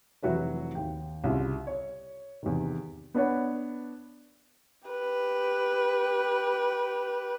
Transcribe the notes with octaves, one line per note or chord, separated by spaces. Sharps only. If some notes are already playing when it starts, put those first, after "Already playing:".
F1 E3 F#3 F#4 B4 E5
D#2 G5
C2 C#3 E4 F4
C#5
E2 C3 D#3
B3 D4 B4 C#5 F#5
G4 B4